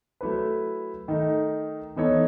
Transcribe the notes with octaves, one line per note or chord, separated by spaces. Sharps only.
F#3 A3 E4 B4
D#3 A3 D#4
E3 B3 D#4 A4 C#5